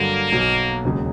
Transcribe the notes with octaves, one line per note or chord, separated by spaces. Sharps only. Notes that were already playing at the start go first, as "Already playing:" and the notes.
Already playing: G2 D3 F#3 A#3
B1 B2 F#3
E1 D#2 C#3 F#3